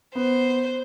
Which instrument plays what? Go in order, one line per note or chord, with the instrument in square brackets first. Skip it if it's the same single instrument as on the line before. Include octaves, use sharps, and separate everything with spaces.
[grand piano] B3 [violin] C5